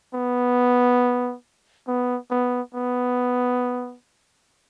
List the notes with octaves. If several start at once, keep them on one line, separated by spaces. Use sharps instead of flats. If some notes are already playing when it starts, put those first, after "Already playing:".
B3
B3
B3
B3